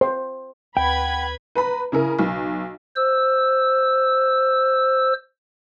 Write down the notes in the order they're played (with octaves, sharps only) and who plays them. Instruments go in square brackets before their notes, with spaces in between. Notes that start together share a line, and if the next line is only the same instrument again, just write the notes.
[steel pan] C5
[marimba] D2 [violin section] B4 B5 G#6 [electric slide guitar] F#5 G5
[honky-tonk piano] B4 A#5 B5
C#3 E4 A#4
B1
[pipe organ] C5 E6